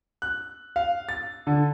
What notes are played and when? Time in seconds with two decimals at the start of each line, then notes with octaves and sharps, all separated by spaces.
0.22 F#6
0.76 F5
1.09 A6
1.47 D3